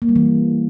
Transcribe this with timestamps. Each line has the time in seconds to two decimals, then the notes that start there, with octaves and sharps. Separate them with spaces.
0.02 A#3
0.09 G3
0.16 E3